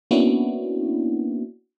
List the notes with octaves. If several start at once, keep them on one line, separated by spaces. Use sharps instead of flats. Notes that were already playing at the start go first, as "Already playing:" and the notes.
A#3 B3 C#4 D4 E4 F#4